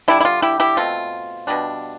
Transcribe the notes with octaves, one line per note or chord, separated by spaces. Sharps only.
D3 G3 D4 E4
E4
F4
E4 G4
E4 G4
B2 A3 C4 F4
B2 G3 D4